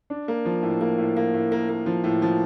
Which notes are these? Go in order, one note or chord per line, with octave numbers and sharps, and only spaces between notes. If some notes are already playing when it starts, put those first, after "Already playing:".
D4
A#3
F3
A2
A#3
A2
A#3
A2
A#3
A#3
F3
A2
F3